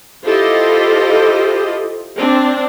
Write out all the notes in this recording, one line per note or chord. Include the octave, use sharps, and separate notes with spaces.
E4 F4 G4 A4 C5 D#5
C4 D4